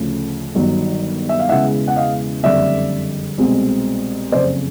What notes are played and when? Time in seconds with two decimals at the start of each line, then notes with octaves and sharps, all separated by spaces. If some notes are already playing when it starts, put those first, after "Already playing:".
Already playing: D2 C#3 F3 A3 C#4
0.55 G1 G2 D#3 F#3
1.29 E5
1.40 F5
1.49 E1 E2 C#3 E3 G#3 E5 F#5
1.88 F#5
1.96 D#5 F5
2.43 F#1 F2 D3 G3 D5 E5
3.38 C2 B2 G#3 C4
4.32 F#1 F2 C#3 C5 D5